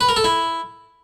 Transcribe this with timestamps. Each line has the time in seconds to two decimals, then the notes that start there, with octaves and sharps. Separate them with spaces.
0.01 B4
0.09 A#4
0.16 A4
0.24 E4